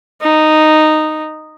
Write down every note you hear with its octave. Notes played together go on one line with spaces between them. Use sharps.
D#4